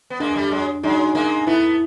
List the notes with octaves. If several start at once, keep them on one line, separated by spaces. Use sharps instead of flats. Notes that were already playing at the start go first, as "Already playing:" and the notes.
B3
G#3 A#3 D4
G3 A3
F#3 G#3
F#3 G#3 D#4
G#3 A#3
A3 B3 E4